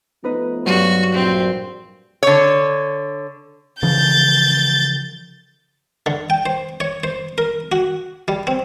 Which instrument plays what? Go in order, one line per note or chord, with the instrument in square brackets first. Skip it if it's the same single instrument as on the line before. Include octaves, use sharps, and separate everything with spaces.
[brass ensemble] F3 A3 B3 [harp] D#4 B4 D#5
[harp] G2 F#3 [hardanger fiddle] F#4
[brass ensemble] A#1 [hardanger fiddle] C4
[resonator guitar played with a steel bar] D3 C#5
[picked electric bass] C#3 E3 F3 [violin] G6 A6
[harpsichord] D3
G5
C5
C#5
C5
A#4
F#4
G3
C4